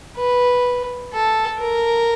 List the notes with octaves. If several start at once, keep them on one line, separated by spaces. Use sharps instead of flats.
B4
A4
A#4